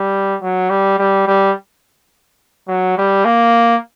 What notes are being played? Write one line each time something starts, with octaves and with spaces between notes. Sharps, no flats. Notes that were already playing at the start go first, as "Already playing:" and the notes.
Already playing: G3
F#3
G3
G3
G3
F#3
G3
A#3